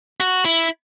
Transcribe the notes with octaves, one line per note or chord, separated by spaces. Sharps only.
F#4
E4